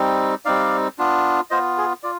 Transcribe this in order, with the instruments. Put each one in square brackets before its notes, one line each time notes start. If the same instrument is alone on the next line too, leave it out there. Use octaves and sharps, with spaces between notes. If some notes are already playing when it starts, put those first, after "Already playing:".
Already playing: [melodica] G3 C4 D#4
G3 C4 D#4 D5 F5
B3 D4 F4
B3 F4 C5 D#5
G#4
F4 D5